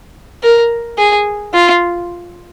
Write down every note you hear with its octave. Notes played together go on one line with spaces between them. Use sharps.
A#4
G#4
F4